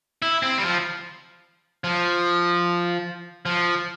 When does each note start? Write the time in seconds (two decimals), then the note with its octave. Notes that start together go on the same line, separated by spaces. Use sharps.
0.22 E4
0.43 C4
0.58 G3
0.63 F3
1.84 F3
3.46 F3